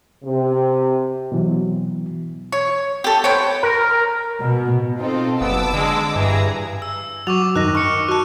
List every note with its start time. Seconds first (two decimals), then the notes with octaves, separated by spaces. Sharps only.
0.23 C3
1.32 B2 E3 F#3
2.52 C#5
3.04 G4 A4
3.24 B3 C5 C#5 G5
3.63 A#4
4.43 B2
4.99 C4 D#4 F4 A4
5.41 F#1 B3 A5 D6 E6
5.74 D3 G#3
6.16 G2 E3 G#4 A#5
6.82 E6
7.27 F#3 F#4 C#6 D6 F7
7.55 F#2 D#3 D#5 F#6 A#6
7.75 C#6 F6 C#7
8.08 F#4 A5 C#6 F#6